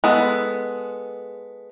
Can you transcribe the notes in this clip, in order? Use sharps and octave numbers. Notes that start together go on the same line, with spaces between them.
G#3 B3 A4